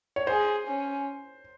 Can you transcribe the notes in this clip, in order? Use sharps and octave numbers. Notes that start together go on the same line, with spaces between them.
C#5
G#4 C5
C#4